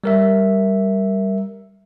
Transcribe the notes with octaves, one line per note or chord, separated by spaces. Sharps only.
G3 A#4 E5